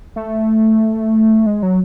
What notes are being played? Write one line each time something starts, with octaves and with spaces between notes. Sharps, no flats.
A3
G#3
F#3